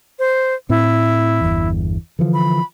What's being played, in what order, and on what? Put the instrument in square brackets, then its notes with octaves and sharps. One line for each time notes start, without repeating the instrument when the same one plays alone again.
[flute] C5
[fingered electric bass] A2 C4 [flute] E4
[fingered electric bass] G1 E2
D3 E3 F3
[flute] B5